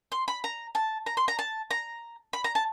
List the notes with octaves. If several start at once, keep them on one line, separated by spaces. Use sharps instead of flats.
C6
B5
A#5
A5
A#5
C6
A#5
A5
A#5
B5
A#5
A5